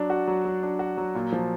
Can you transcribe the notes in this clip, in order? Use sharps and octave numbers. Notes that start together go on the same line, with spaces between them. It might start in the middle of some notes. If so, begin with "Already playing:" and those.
Already playing: F#3 D4
F#4
F#3
F#3
D4
F#4
F#3
A#2
F3